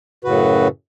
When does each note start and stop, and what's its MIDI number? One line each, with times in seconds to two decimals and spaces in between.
0.24 0.68 42
0.24 0.68 45
0.24 0.68 49
0.24 0.68 66
0.24 0.68 71